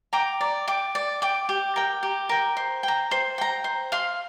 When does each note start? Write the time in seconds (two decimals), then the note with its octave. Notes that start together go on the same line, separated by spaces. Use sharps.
0.13 G5 A#5 D6
0.41 D5
0.68 G5 D6
0.95 D5
1.22 G5 D6
1.49 G4
1.76 A#4 G5
2.03 G4
2.29 A#4 G5
2.57 C5
2.83 G5 A#5
3.11 C5
3.38 G5 A#5
3.64 C5
3.92 F5 C6